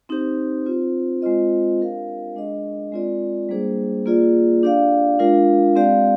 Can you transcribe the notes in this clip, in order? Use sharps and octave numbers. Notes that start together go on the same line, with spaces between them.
C4 D#4 G4 C5
C4 F4 C5
G#3 C4 F4 C5 D#5
D4 G4 A#4 F5
G#3 D4 G#4 D#5
G#3 C4 F4 A#4 D5
G3 A#3 D4 G#4 C5
A#3 F4 G#4 D5
D4 G4 D5 F5
G#3 D4 F4 A#4 F5
G#3 C4 G4 D5 F5